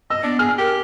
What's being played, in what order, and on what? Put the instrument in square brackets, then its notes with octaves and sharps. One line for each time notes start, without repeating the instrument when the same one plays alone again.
[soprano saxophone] D#5 [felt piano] E6
[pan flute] B3 [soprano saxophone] D4
[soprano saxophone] G#4 [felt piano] F6
[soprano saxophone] G4 [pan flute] A#4